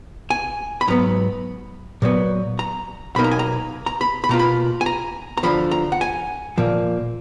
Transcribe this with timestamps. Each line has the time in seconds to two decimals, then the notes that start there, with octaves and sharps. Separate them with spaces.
0.30 G#5
0.81 B5
0.87 G#2 F#3 B3 A#5
2.02 A#2 F#3 B3
2.59 A#5
3.16 B1 B2 A#3 D#4 B5
3.24 A#5
3.31 G#5
3.39 A#5
3.86 A#5
4.01 B5
4.24 B5
4.29 B2 A#3 F4 A#5
4.39 B5
4.81 G#5
4.86 A#5
5.38 A#5
5.43 D2 D3 F3 B5
5.71 A#5
5.92 F#5
6.01 G#5
6.58 A#2 F3 A#3